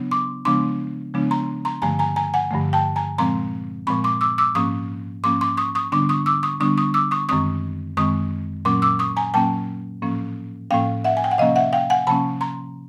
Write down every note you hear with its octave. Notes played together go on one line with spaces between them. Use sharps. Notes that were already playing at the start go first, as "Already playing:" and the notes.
Already playing: C#3 F#3 B3 D4
C6 D6
C#3 F3 G#3 B3 D4 C6 D6
C#3 F3 G#3 B3 D4
A#5 C6
A#5 C6
G2 D3 F3 A3 G#5 A#5
G#5 A#5
G#5 A#5
F#5 G#5
G2 D3 F3 A3
G5 A5
G#5 A#5
A#2 F3 G#3 C4 A#5 C6
A#2 F3 G#3 C4 B5 C#6
C6 D6
D6 E6
D6 E6
G#2 F3 A#3 C#4 C#6 D#6
G#2 F3 A#3 C#4 C6 D6
C6 D6
C#6 D#6
C#6 D#6
D3 G3 B3 D4 C6 D6
C#6 D#6
D6 E6
C#6 D#6
D3 G3 B3 D4 C#6 D#6
C#6 D#6
D6 E6
C#6 D#6
F#2 D#3 G#3 C4 C#6 D#6
F#2 D#3 G#3 C4 C#6 D#6
A#2 F#3 A#3 C#4 C6 D6
D6 E6
C#6 D#6
G#5 A#5
A#2 F#3 A#3 C#4 G5 A5
A2 F3 A#3 C#4
A2 F3 A#3 C#4 F5 G5
E5 F#5
G#5
G5
F#5
C3 F3 A#3 C#4 D#5 F5
E5 F#5
F5 G5
F#5 G#5
C3 F3 A#3 C#4 A5 B5
A#5 C6